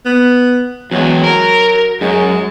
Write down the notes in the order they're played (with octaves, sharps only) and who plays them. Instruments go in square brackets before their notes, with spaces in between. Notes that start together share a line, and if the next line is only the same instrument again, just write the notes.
[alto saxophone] B3
[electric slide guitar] E2 G#3 [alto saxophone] F#3
[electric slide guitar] A#4
[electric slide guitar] F#2 [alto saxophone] G#3